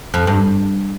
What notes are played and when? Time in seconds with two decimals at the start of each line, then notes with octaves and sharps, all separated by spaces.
0.14 F2
0.27 G2